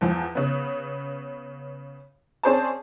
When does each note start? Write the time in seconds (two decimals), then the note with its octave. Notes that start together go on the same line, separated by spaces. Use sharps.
0.01 E2 F3
0.35 C#3 B3
2.43 C4 C#4 G#4 C5 D5 A5